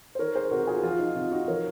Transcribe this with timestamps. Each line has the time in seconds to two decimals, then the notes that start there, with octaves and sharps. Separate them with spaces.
0.15 C5
0.19 D#3 A#4 C#5
0.35 G#4 C5
0.51 C3 F#4 A#4
0.63 F#4
0.67 F4 G#4
0.76 F#4
0.83 F3 F4
0.99 D#4
1.16 C3 F4
1.31 D#4 F#4
1.48 F3 A#4 C#5